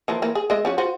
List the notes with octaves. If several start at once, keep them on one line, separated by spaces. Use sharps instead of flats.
E3 F3 A#3
E3 A#3
G#4
G#3 D#5 E5
F3 C#4 F#4
F4 F#4 C5